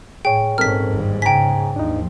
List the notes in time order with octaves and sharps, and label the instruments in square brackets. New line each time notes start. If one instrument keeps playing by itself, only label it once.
[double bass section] A2 [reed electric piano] G#4 C#5 [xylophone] G5
[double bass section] A#1 C#4 [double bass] G#2 [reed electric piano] C4 A4 A#4 [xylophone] F6 B6
[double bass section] G1 D#2 G3
[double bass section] C#3 [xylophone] G5 B6 [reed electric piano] G#5 A#5
[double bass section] D#2 F3 [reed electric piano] D4 D#4